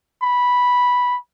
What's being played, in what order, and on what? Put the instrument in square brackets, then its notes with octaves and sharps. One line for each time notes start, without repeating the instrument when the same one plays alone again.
[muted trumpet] B5